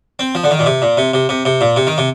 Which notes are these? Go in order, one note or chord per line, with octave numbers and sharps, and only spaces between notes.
C4
F3
D3
D#3
A#2
C3
A#2
C3
C3
C3
C3
A#2
C3
D#3
C3